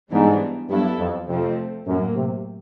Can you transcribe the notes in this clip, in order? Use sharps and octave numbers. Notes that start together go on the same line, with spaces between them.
G#2 E3 G3 B3 D4
G2 F#3 B3 E4 A4
F2
F2 C3 F3 A3 C4
F#2 A2 F#3 A#3
C3